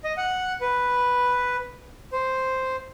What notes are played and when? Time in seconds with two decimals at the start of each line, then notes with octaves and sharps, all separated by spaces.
0.04 D#5
0.17 F#5
0.61 B4
2.12 C5